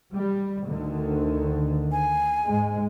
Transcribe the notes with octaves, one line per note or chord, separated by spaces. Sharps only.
G3
D2 D3 D#3
G#5
G#2 G#3